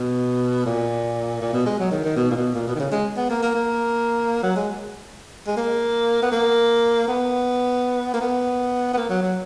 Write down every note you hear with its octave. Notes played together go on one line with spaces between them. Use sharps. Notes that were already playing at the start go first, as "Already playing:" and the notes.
Already playing: B2
A#2
A#2
B2
G#3
F#3
D#3
D#3
B2
A#2
B2
A#2
B2
D#3
C#3
G#3
B3
A#3
A#3
A#3
F#3
G#3
G#3
A#3
B3
A#3
B3
A#3
B3
B3
A#3
F#3
F#3